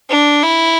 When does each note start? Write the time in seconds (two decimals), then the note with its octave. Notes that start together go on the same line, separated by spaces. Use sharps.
0.10 D4
0.43 E4